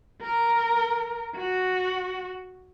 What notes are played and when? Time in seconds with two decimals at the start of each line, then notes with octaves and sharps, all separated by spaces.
0.22 A#4
1.36 F#4